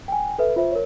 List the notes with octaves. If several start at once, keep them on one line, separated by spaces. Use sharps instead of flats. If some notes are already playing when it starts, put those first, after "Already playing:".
G5 G#5
A4 B4 E5
F4 C5 E5
A#4 C#5